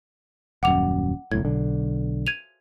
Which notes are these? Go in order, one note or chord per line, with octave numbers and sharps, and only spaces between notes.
D#1 F#2 F#5 D6 F7
F#1 C2 A2 G#6
B1 D3
G#6 D#7 F7